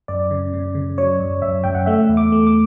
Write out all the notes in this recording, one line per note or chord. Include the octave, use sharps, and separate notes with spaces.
F#2 D5
C#3
C#3
C#3
F#3 C#5
F#2
F#2 E5
F#2 G5
F#5
A3 E5
E2
D6
A3
D6